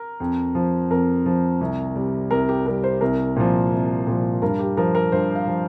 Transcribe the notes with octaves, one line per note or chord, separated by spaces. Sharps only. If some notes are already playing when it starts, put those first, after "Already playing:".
Already playing: A#4
F2
F3
F2 A#4
F3
C2
C3 G3
C2 A#4
G4
C3 G3 A#4
C5
C2 A#4
A#2 F3
C2
A#2 F3
G2 A#4
G4
F3 A#4
A#4
G2 C5
F5
F3